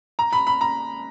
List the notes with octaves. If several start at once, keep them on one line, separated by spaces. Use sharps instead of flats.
A#5
B5
B5
A#5